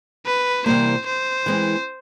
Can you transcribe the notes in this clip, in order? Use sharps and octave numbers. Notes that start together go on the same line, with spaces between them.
B4
C3 E3 G3 A#3 C5
C5
E3 G#3 C4